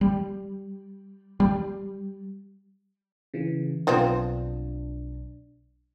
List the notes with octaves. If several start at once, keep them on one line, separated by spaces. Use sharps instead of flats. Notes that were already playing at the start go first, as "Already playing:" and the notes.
G3
G3
C#3 E3
B1 F3 B3 C4 D4